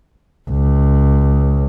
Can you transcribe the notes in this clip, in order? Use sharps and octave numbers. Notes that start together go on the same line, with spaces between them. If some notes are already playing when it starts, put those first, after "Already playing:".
C#2